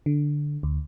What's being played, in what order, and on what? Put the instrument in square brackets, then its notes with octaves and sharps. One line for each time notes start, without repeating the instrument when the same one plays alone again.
[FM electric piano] D3
D2